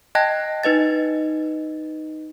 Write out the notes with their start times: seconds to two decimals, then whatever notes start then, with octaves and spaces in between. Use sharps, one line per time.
0.15 D#5 G5 A5 F#6 G#6 A#6
0.63 D#4 B4 D#5 A6